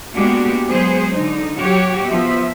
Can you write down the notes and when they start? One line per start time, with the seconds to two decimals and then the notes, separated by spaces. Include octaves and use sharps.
0.15 G#3 A#3 B3 D4 F#4 G4
0.69 F#3 G#3 B3 G#4 C5
1.14 D3 D#4
1.60 F#3 F#4 G4 C#5
2.07 F3 B3 E5